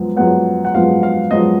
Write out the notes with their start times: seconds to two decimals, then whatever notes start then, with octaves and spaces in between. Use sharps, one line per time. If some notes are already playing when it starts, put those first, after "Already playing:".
Already playing: F#2 F3 G#3 B3
0.16 F#2 F3 G#3 B3 F#5
0.65 F#5
0.74 F#2 F3 G#3 B3 F5
1.03 F5
1.31 F#2 F3 G#3 B3 D#5